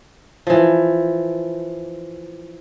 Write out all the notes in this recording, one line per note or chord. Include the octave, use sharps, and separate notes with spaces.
E3 F3